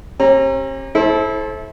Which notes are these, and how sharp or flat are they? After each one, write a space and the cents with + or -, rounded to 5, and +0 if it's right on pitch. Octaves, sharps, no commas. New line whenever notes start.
C#4 -45 G4 +0 A#5 -5
E4 -25 A4 -25 C5 +30